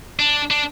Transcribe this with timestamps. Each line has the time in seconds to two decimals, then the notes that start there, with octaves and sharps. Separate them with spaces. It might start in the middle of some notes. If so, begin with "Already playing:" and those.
0.19 D4
0.51 D4